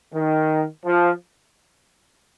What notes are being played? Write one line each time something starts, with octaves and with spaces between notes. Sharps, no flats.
D#3
F3